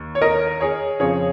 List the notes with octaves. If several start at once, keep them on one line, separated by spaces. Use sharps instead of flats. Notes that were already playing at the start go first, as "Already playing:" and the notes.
Already playing: D#2 D#3
C#5
A#4 D#5
G#4 C#5
F2 C#3 F3 G#4 C#5